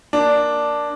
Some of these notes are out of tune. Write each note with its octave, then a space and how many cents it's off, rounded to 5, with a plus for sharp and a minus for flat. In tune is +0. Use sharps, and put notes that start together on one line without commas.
A#3 +0 D4 +0